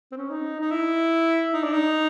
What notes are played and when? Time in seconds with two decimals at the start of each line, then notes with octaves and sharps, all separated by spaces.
0.12 C4
0.17 C#4
0.30 D#4
0.61 D#4
0.71 E4
1.53 D#4
1.64 D4
1.73 D#4